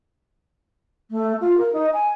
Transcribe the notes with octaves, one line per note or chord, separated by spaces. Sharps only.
A3
F4
A#4
D#4
G#5